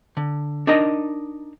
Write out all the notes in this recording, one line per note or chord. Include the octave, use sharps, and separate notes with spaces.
D3
D4 D#4 A#4 D#5 A#5